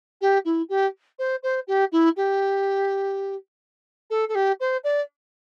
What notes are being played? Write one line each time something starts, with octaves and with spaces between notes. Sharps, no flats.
G4
E4
G4
C5
C5
G4
E4
G4
A4
A4
G4
C5
D5